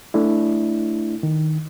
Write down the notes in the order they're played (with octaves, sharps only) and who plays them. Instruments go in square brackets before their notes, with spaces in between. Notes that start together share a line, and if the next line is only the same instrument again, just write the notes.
[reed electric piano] A3 D4 E4
D#3